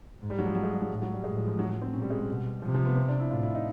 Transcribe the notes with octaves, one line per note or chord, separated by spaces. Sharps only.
G#2
G3
F#3
F3
F#3
G#3
G3
F#3
A2
F#3
G3
A2 G#3
F3
F3
F#3
F#3
C4
A#2 C#4
G3
G#3
G3
B2
C3 F3
F3
B3
C4
D4
E4
A2 F4
E4
D#4